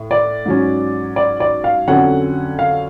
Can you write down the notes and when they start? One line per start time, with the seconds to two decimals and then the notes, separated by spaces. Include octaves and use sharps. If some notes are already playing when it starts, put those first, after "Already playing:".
Already playing: A2
0.11 D5
0.46 G#2 F#3 C#4
1.16 D5
1.40 D5
1.64 F5
1.88 F2 D3 F#3 C#4 F#5
2.59 F5